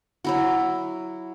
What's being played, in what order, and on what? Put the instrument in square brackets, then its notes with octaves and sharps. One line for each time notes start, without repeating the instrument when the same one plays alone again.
[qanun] F#3 E4 F#4